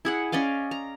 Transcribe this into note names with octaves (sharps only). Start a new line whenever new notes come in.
E4 G#4 F#5
C#4 D5 D#5 F5
A#5